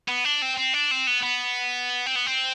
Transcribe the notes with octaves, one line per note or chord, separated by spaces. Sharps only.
B3
D4
C4
C4
D4
C4
B3
B3
C4
B3
C4